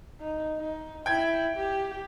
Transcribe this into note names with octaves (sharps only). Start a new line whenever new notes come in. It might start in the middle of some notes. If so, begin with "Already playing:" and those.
D#4
D#4
E4 G5 G#6
G4